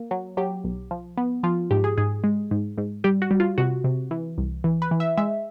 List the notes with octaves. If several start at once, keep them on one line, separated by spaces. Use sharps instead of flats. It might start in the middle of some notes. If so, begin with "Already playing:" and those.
Already playing: A#3
F#3
F#3 G4
B1
F3
B3
F3 F4
G#2 G4
G#4
G#2 G#4
G#3
G#2
G#2
G3 G4
F#4
G3
F4
C3 F#4
C3
E3
C2
E3
B4
E3
E5
G#3 E5